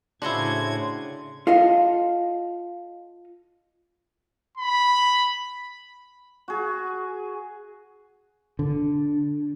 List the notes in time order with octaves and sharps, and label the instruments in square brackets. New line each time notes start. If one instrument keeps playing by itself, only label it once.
[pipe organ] A2 G#6 [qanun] C#3 F#4 C5 [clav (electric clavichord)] D4 E4 [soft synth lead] C6
[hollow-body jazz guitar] F4 A4 D#5 F5
[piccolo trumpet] B5
[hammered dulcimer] F#4 G#4
[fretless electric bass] D3